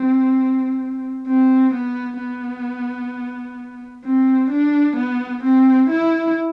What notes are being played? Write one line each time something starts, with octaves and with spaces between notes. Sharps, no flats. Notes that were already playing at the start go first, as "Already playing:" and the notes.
Already playing: C4
C4
B3
B3
C4
D4
B3
C4
E4